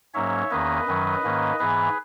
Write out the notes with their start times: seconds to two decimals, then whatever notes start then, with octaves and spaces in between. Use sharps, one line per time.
0.14 G#2 F#3 A#3 C#4 C#5 E5
0.51 E2 D#3 A#3 C#4 B4 D#5
0.87 F#2 D#3 F#3 C#4
1.23 G#2 D#3 A#3 C#4
1.59 G#2 E3 B3 G#4 B4